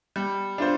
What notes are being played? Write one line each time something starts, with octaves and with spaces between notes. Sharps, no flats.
G3
D4 F4 C5